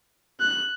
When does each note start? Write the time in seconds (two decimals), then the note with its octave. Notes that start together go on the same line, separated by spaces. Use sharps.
0.40 F#6